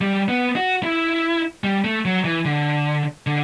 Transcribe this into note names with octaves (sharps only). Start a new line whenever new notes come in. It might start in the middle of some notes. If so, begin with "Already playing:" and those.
G3
B3
F#4
E4
G3
A3
F#3
E3
D3
D3